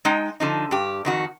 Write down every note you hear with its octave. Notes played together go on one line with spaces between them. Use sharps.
G#3 D#4 G5
D3 F3 D#4
G2 G4
F2 D#3 F#4